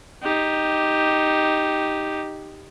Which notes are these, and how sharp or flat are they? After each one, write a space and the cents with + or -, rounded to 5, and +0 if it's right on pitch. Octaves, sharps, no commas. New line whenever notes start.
D#4 +0 G4 +0